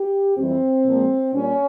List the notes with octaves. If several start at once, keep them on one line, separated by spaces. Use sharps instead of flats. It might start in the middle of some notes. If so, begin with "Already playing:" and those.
Already playing: G4
F2 E3 G3 C4
A#2 F3 G#3
A#2 G3 C#4